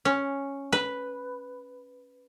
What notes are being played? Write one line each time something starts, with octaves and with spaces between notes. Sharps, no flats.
C#4
B4